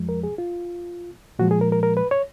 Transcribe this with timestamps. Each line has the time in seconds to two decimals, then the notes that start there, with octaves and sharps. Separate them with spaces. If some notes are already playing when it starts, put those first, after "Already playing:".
Already playing: F2 F3 G#3
0.09 A#4
0.24 G#4
0.38 F4
1.39 A#2 F3 G#3 F#4
1.51 G#4
1.61 A#4
1.72 A#4
1.83 A#4
1.97 B4
2.11 C#5